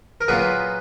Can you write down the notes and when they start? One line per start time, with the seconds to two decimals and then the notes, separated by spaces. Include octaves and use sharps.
0.21 A#4
0.28 A#2 F#3 B3 F4 G#4 B4